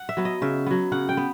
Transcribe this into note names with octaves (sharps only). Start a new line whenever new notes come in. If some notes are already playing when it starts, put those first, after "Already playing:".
Already playing: F#5
E5
F#3 B3
D#5
C#3 E5
F#3 B3
C#3 F#5
G5
B3